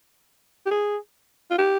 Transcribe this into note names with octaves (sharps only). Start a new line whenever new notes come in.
G4
G#4
F4
G4